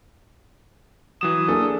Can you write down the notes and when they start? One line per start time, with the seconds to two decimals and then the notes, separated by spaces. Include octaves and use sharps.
1.21 E3 F#3 D#6 E7
1.48 A#3 D4 G#4 A4